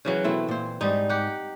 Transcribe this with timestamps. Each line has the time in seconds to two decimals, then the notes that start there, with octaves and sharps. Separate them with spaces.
0.05 C#3 E3 F#3
0.24 B2 A3 C4 E4
0.48 A#2 C5
0.81 G#2 G3 D#4
1.09 G4 F#5